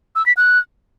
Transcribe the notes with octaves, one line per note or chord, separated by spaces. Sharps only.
E6
B6
F#6